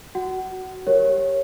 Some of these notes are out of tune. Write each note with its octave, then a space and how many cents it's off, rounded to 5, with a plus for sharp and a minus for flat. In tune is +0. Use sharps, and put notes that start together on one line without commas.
F#4 +10 F#5 +25
G4 +0 A#4 +0 C#5 -10